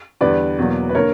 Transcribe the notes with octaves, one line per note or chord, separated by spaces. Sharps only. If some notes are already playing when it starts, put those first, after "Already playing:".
E2 D3 G3 B4 D5
E2 B2 F#3 A#3
B4
D3 A#3 A#4 C#5